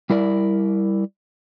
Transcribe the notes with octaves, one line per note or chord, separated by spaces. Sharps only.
G3 E4 A#4 D5